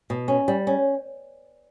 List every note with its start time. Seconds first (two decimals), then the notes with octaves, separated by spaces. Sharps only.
0.10 B2
0.28 C#4
0.48 G3
0.67 C#4